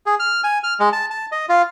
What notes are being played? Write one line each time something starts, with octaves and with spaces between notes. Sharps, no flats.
G#4
F6
G#5
F6
G#3
A5
A5
D#5
F4